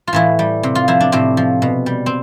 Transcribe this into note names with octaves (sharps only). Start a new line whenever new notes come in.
F4
A2 E3 E4
G3
C3
F4
F3 E4
D4
A2 C3 C4
F3
B2
G3
C4